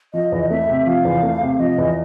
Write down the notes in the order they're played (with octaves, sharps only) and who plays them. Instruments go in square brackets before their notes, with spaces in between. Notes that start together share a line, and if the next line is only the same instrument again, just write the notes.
[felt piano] F3 [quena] D#5
[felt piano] E2
[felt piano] A3 [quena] E5
[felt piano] C3
[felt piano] F3 [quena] F5
[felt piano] E2
A3
C3
[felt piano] F3 [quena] D#5
[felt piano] E2